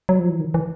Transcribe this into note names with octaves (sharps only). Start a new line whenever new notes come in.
F#3
F3
E3
D#3
E3